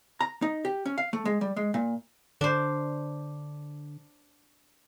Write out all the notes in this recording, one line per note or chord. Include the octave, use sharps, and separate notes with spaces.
A#5
D#4
G4
C#4
F5
A3
G#3
G3
G#3
A#2
D3 D4 C5